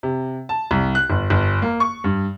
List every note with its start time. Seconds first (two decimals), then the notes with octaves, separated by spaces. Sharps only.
0.03 C3
0.49 A5
0.71 C2
0.95 F#6
1.10 G1
1.30 G1
1.62 A#3
1.80 C#6
2.04 G2